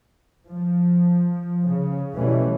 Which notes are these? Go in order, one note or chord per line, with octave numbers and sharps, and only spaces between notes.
F3
C#3
B2 E3 G3 A3 C#4